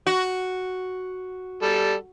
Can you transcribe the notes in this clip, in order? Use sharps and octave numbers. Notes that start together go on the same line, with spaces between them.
F#4
G3 A4